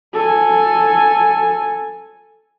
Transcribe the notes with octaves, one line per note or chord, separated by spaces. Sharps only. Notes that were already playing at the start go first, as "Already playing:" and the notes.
A4 G#5